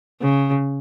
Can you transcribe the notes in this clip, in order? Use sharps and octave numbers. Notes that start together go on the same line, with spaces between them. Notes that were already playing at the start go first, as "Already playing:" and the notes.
C#3